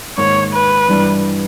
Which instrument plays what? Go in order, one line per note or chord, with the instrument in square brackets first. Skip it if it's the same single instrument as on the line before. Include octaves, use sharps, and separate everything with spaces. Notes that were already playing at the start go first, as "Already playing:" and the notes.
[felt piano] G#2 D#3 A#3 [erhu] C#5
[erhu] B4
[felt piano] G2 E3 G3